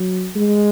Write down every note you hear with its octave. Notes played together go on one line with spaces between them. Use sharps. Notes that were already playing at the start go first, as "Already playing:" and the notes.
Already playing: F#3
G#3